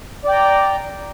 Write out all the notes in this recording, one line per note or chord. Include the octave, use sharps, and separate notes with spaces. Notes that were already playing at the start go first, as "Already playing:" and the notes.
D5 G5 A#5